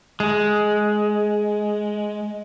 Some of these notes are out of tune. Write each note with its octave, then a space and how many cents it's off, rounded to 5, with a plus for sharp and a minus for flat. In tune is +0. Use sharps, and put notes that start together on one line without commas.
G#3 +10